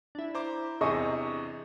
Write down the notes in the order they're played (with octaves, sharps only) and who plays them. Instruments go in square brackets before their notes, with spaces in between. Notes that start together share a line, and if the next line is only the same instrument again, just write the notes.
[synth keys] D4 E4
[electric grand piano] C5 A#5 D6
[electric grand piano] E2 C3 [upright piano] G#4 D#5 C#6